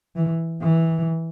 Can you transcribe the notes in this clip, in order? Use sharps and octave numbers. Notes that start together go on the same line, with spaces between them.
E3
E3